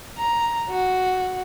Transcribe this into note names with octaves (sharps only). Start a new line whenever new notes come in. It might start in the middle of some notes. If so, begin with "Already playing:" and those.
A#5
F#4